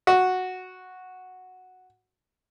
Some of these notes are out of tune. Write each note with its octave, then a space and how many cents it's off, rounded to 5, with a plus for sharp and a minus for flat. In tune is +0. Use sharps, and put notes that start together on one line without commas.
F#4 -5